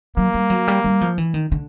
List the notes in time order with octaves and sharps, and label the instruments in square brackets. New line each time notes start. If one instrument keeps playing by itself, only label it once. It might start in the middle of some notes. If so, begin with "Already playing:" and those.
[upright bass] F#3 [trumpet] A#3
[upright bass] G3
F#3
G3
G3
F3
E3
D#3
D3